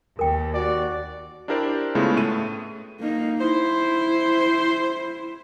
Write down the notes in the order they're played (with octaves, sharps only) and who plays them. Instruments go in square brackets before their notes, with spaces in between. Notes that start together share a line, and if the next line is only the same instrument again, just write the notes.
[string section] D#2 [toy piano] A#4 G5
[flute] F#4 [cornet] D5
[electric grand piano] D4 E4 G4 A#4 C5 D5
C#3 G#3 A3 B3 E4 F4
A2 A3 D#7
[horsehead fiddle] A#3 D#4
[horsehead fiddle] E4 [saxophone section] C5